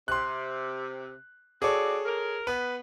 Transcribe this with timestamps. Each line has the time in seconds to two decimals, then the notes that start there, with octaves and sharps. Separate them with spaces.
0.08 C3 C6 F#6
1.62 C4 F#4 G#4 A4 C#5 D5
2.05 A#4
2.47 B3 B4